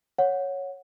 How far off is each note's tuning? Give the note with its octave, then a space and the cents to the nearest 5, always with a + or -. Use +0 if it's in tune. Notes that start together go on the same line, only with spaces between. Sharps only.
C#5 +0 F#5 -15